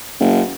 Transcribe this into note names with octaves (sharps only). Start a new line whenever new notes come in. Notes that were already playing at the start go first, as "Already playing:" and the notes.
F#1